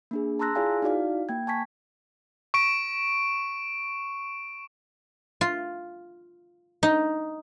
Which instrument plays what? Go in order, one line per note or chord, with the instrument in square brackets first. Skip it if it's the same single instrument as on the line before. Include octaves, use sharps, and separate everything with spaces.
[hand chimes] A#3 D4 G#4
A5 A#5 C6 E6 F#6 A#6
E4 F4 G#4 D5 F5 G#5
D#4 E4 F#4 D5 F5
A#3 G5 G#6
G#5 A5 C#6 G#6 B6
[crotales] C#6 D7
[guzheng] F4
D#4